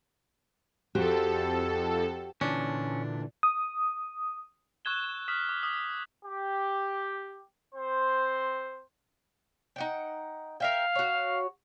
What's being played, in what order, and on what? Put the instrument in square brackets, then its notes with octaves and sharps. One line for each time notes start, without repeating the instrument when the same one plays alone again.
[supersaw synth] F2 A4 [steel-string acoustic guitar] F#4 G4 C5
[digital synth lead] A#2 [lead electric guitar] D3 E3 [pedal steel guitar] C#4 [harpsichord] D4
[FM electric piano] D#6
[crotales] C#6 E6 F#6 G#6 E7 G7
C#6
C#6 D#6 F6 B6 E7
D6
D#6
[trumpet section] G4
C4 C5
[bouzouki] D#4 F#5 G5
[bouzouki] A#4 E5 G5 [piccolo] F5
[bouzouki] F#4 C#5